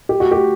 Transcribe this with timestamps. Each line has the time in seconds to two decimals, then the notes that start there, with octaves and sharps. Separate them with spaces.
0.09 G4
0.20 F#4
0.31 G4